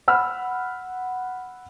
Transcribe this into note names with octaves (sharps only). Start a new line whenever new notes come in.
F#5 B5 E6 F6